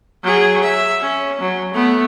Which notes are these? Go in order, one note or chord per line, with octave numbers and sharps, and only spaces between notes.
F#3 G#4
E5
C#4
F#3
A3 B3